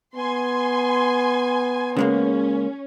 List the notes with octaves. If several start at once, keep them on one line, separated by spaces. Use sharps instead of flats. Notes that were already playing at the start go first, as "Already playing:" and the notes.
B3 G#5 C6
C#3 G#3 A#3 C#4